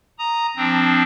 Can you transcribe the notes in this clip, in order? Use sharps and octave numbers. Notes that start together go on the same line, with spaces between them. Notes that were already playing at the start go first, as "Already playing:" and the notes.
A#5 D#6
F3 C4 D4